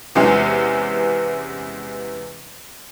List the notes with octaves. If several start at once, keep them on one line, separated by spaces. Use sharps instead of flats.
E2 C3 E3 G#3 B3 C#4